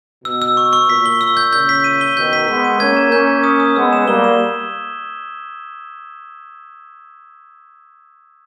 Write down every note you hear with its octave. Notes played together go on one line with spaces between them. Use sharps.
B2 E6
E6
C#6
C#6
A#2 B6
G7
E6
G6
A#2 C#3 G6
B6
D#7
G7
B2 D#3 G6
B6
G#3 B3 B6
D#7
A#3 C#4 G#6
E7
A#3 C#4 G6
G6
D#6
D#6
G#3 B3 E6
E7
G3 A#3 G7
E7